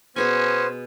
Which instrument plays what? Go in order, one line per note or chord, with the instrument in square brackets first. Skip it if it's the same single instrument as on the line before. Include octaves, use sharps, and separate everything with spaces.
[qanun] B2 G#4 G#5 [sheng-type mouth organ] B3 C5 [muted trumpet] C#4